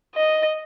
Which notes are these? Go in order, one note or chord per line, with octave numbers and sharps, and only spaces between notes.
D#5